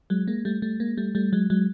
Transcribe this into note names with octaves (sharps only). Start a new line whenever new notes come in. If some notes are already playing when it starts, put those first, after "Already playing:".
F#3 G#3
G#3 A#3
G3 A3
G3 A3
G#3 A#3
G3 A3
G3 A3
F#3 G#3
F#3 G#3